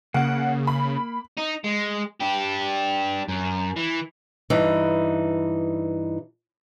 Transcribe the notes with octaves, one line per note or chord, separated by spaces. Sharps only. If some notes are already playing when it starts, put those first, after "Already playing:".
C#3 A#3 F#5
B5
D#4
G#3
D4 G4
F#2
E3
G2 E3 D#4